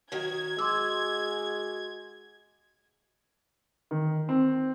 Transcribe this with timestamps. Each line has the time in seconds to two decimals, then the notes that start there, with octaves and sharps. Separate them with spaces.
0.12 D#3 F#3 G#6
0.59 G#3 F#4 C6 D6 E6
3.91 D#3
4.29 C4